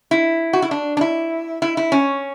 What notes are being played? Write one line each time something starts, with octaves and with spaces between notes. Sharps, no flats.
E4
F#4
E4
D4
D4
E4
E4
E4
C#4